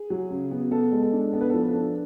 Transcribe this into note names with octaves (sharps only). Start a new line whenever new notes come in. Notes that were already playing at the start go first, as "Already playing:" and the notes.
Already playing: G#4
F#3
C#3
B3
B3 A4
G#3
A4
D4
B3 A4
B4
F3 A4
A4
D4